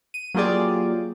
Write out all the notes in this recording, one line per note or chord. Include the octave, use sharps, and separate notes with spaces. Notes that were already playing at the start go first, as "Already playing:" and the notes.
D#7
F#3 A#3 F4 G4 G#4 D5